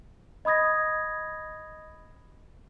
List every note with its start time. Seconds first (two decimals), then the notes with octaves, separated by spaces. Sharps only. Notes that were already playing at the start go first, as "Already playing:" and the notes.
0.45 D#5 B5 D#6 G#6 A#6